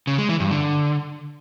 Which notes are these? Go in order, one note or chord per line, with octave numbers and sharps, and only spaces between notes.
C#3
G#3
E3
G2
D3